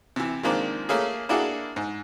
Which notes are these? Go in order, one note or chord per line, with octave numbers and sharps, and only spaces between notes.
C3 E3
D#3 F3 G#3 A#3 C4 D4
A3 A#3 C#4 G#4
A#3 D4 E4 F#4 G#4 A4
G#2